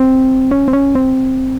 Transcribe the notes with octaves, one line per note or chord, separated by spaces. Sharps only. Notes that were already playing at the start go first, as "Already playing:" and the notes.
Already playing: C4
C#4
C4
C#4
C4